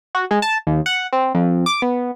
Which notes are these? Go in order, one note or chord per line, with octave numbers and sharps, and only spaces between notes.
F#4
G#3
A5
D#2
F#5
C4
F2
D6
B3